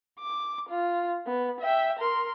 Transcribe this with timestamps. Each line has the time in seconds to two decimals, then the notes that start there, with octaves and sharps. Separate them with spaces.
0.20 D6
0.69 F4
1.26 B3
1.60 E5 G5
1.99 A#4 C6